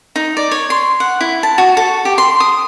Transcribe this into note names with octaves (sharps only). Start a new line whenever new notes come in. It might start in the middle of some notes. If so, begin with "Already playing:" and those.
D#4
D5
C#5
C6
F#5
E4
A5
F#4
A4
G4
C6
D#6